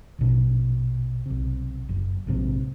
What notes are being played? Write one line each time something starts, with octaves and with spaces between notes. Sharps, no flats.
A#1 B2 C#4
B1 C3
F#1
A#1 G#2 C3